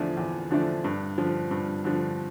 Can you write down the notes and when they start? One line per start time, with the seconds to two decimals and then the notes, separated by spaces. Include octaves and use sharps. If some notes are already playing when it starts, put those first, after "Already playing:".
Already playing: E2 D3 F3 A3 D4
0.17 E2
0.51 D3 F3 A3 D4
0.84 G2
1.18 D3 F3
1.51 G2
1.85 D3 F3